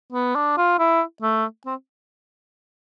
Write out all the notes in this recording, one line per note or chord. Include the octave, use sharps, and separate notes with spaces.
B3
D4
F4
E4
A3
C4